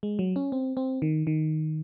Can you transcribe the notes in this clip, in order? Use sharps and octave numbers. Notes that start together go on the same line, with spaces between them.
G#3
F#3
C#4
C4
C4
D#3
D#3